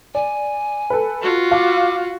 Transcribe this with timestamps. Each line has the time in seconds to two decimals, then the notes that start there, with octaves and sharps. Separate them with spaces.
0.15 D5 G#5
0.90 A4 B4
1.22 F4 F#4
1.51 F5 D6